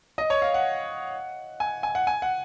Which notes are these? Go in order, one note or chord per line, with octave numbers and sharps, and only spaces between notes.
D#5
C#5
F5
F#5
G#5
G#5
F#5
G#5
F#5